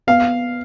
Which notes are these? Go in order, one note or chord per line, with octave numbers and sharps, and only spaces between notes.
B3 F5